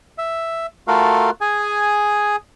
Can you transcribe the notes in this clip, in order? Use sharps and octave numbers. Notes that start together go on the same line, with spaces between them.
E5
A3 F4 F#4 A4 A#4 F5
G#4 G#5